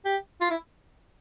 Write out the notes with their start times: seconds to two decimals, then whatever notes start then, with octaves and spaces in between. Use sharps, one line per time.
0.05 G4
0.41 F4
0.51 E4